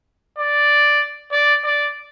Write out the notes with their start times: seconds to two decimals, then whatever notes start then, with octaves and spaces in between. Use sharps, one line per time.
0.38 D5
1.32 D5
1.64 D5